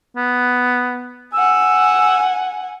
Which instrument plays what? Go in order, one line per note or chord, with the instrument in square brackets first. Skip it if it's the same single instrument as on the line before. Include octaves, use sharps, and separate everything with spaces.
[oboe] B3
[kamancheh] F#5 G#5 [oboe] E6